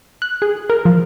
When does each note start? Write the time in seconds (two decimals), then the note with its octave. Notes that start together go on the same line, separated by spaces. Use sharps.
0.22 F#6
0.42 G#4
0.70 A#4
0.85 F3